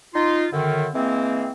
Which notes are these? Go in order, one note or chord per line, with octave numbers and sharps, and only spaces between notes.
D#4 F4
F#2 D3 D#3
E3 G#3 A#3 C4